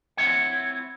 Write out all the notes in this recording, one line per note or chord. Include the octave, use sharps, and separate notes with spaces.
C4 E4 C#5 F#5